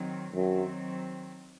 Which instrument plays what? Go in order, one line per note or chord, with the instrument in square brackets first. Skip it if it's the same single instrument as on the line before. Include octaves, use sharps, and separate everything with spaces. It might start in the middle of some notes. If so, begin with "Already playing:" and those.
Already playing: [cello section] D#3 F#3 C4
[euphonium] F#2 [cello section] D#3 F#3 C4